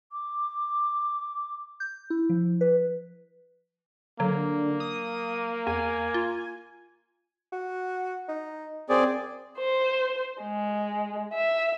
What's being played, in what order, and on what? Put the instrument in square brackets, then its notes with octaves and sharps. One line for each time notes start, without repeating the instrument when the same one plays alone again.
[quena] D6
[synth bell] G6
E4
F3
B4
[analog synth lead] D3 [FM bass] F#3 [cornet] A#3
[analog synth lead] D#6
[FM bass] E2 [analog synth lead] G#5
[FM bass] F4
[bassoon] F#4
D#4
[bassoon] F#2 [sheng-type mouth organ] C4 G#4 D5
[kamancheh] C5
G#3
E5